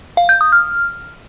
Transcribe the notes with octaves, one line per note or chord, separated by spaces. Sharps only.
F5
G6
D#6
F6